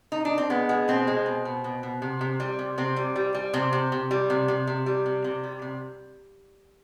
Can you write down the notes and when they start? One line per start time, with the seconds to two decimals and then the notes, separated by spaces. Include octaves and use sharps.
0.12 D#4
0.25 D4
0.38 C4
0.50 G#3 B3
0.69 G#3
0.88 B2 C4
1.07 G#3
1.26 B2
1.45 B2
1.64 B2
1.83 B2
2.02 C3
2.21 C3
2.40 G3
2.59 C3
2.78 C3 C4
2.96 G3
3.16 G3
3.34 G3
3.54 C3 C4
3.73 C3
3.92 C3
4.11 G3
4.30 C3
4.48 C3
4.67 C3
4.86 G3
5.06 C3
5.24 C3
5.43 G3
5.62 C3